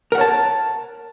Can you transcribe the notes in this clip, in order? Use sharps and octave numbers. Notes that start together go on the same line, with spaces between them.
A#4 C#5 F#5 A5